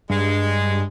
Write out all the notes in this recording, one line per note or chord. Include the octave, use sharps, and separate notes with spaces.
G2 G#3